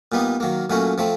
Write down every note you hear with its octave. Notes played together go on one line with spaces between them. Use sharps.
A#2 G3 B3 D#4
D#3 F#3 A#3
A#2 F#3 A3 C#4 F#4
F3 A3 C4